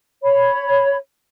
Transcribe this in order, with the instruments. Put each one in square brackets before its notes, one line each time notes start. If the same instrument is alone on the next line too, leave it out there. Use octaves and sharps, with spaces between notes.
[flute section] C#5 B5